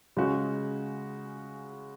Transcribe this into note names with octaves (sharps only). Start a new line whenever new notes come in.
C#3 G#3 C#4 F#4